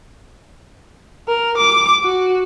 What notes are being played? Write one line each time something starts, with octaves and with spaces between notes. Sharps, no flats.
A#4
D6
F#4